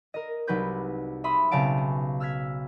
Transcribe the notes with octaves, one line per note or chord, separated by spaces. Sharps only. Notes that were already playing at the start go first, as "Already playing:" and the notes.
A#4 D#5
C2 F#3 D#4 G4 B4 G6
E5 B5 C6 D#6
B1 C#3 C4 F5 A5 D7
C#4
E6 F6 G#6 B6